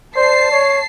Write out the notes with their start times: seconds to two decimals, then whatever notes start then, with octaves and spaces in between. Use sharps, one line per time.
0.16 C5 D5 A5 C7
0.52 C#5